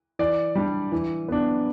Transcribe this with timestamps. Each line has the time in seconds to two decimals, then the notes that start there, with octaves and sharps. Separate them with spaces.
0.19 E3 D5
0.55 G3 D4
0.92 E3
1.28 B3 D4